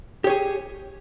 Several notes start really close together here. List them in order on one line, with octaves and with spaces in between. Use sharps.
G4 C#5 G#4